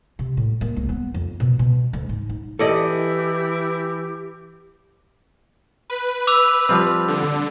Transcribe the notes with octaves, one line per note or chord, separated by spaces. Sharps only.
C3
A2
A#3
C#2
B3
F2
B2
B2
D2
G#2
D#4
E3 G4 A4 D5 D#5
B4
D6 E6 F7
F3 G3 C4
D3